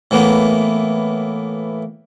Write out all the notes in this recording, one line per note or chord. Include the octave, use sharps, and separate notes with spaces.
A2 E3 A#3 B3